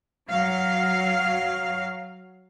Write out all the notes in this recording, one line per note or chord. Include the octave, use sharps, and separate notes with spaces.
F#3 F5